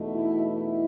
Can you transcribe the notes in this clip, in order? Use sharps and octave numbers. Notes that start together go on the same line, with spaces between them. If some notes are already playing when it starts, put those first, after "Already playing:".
Already playing: E2 B2 A3 D#4
E4
E4